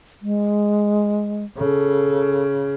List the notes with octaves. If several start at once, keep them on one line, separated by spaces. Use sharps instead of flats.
G#3
C#3 A4